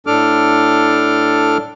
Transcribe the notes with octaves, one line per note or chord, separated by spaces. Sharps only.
A2 D4 A4 D6 F6